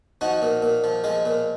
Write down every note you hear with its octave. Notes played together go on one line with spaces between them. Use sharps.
F3 D#4 F#4
A#2
A#2
F3
F3 G#3
A#2